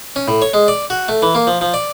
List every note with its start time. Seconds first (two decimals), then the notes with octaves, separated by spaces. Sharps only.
0.16 C#4
0.28 A2
0.42 C#5
0.54 G#3
0.68 D5
0.90 F#4
1.08 A3
1.22 E3
1.35 A#3
1.47 F3
1.61 F3
1.74 D5